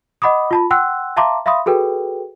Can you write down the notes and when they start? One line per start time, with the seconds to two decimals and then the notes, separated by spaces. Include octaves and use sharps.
0.22 D#5 F#5 B5 D6 D#6
0.51 F4 A5 B5
0.71 F#5 G5 C6 E6 F#6
1.17 E5 F5 A5 A#5 C6 D6
1.46 E5 F5 B5 C6 D#6
1.66 F#4 G#4 A4 B4 G5